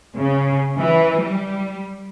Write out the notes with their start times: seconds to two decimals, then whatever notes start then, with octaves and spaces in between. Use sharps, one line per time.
0.17 C#3
0.77 E3
1.20 G3